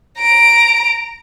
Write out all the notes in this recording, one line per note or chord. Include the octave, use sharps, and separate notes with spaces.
A#5 D7